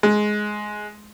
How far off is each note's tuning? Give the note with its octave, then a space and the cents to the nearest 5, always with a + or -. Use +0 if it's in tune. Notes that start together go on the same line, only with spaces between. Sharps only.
G#3 +10